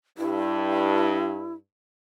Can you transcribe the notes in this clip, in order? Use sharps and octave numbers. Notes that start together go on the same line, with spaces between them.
G2 E4